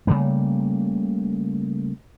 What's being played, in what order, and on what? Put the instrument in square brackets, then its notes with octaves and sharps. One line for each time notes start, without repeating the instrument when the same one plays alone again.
[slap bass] C#3 G3 A3 A#3